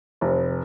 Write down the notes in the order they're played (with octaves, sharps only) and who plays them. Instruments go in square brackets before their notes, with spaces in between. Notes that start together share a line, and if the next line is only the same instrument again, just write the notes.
[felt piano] F1